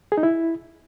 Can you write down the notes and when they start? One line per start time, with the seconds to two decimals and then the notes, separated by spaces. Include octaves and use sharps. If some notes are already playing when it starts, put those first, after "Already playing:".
0.12 G#4
0.18 D#4
0.23 E4